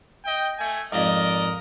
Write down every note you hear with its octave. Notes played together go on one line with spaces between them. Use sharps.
D#5 G5
A3 G#5
F2 G#2 A#4 D5 D#5